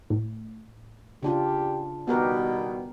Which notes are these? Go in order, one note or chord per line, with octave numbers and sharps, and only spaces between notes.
A2
C#3 D4 F4 G4
B2 D#3 G3 B3 G4 A#4